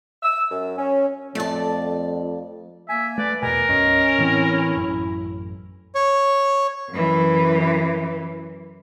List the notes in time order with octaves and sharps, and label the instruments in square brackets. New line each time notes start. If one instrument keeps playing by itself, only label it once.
[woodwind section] E6
F#2
C#4
[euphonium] F2 [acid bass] A3 [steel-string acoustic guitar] D5 A5
[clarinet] A#3 [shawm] E5 [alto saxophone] G#5
[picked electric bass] A3 [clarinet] B4 [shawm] D5
[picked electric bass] E2 B2 [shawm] A#4 [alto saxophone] G#5
[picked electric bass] B1 F#2 [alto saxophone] C#4 [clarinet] D#5
[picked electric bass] A2 E3 C4 [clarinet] E4
[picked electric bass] A1 F#2
[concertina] C#5
[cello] F#2 E3